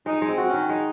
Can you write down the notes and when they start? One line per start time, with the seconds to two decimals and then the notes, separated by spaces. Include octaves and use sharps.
0.06 G#3 D#4
0.22 G#3
0.27 C4
0.38 F#4
0.48 C#4
0.53 D#3
0.69 G#3 D#4